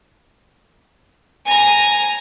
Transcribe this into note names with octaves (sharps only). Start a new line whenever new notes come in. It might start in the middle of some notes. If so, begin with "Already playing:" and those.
G#5 A#5